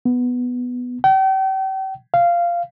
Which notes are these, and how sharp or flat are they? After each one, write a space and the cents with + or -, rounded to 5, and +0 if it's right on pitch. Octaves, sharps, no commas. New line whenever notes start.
B3 +0
G5 -40
F5 -15